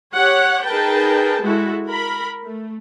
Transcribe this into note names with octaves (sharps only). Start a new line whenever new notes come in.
G4 C#5 F#5
D#4 G#4 A#4 B4 G5 A5
G#3 E4 F#4 A4
A#4 B5
A3